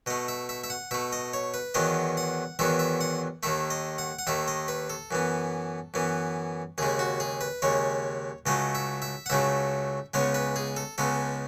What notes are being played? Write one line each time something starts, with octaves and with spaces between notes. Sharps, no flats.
B2 A3 D#5
E5
E5
E5
F#5
B2 A3 E5
D#5
C#5
B4
E2 D#3 F#3 B3 D#5
F#5
E2 D#3 F#3 B3 E5
E5
F#5
D#2 D#3 A3 E5
D#5
F#5
F#5
D#2 D#3 A3 E5
D#5
B4
A4
F#2 E3 B3
F#2 E3 B3
D#2 C#3 G#3 G#4
F#4
G#4
B4
D#2 C#3 G#3 C#5
C#2 C#3 F#3 A3 D#5
E5
E5
F#5
C#2 C#3 F#3 A3 E5
C#2 C#3 G#3 B3 C#5
B4
G#4
A4
C#2 C#3 G#3 B3 A4